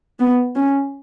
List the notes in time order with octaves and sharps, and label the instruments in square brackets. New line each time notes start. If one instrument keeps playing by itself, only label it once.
[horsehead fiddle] B3
C#4